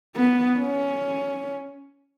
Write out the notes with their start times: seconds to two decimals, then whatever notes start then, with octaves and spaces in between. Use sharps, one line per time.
0.16 B3
0.59 C#4